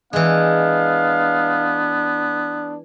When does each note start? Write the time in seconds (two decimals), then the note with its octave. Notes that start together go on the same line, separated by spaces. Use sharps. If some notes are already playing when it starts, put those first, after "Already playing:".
0.13 E3 G#3 B3 D4 F5